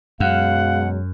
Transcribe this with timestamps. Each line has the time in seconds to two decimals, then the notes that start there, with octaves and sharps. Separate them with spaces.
0.20 F#2 B2 F#3 G#3 F5 F#5